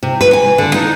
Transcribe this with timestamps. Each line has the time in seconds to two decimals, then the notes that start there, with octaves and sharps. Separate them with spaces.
0.03 C3
0.21 B4
0.33 G#5
0.58 D3
0.74 D#4